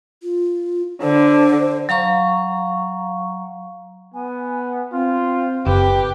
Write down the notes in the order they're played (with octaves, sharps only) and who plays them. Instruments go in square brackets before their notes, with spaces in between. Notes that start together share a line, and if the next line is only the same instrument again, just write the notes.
[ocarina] F4
[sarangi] D3 [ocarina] C5
[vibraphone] F#3 F5 A#5 C#6
[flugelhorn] B3 [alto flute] G#5
[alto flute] C4 [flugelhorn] F4
[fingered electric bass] F#1 [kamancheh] G4 [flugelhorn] B4